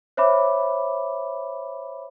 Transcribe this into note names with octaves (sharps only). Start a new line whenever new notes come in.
C5 C#5 E5 B5 D6